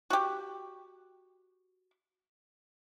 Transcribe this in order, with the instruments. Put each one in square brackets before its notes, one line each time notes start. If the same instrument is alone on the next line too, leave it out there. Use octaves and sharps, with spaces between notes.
[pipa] F#4 G4